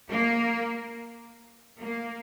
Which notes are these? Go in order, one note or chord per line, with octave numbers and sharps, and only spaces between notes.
A#3
A#3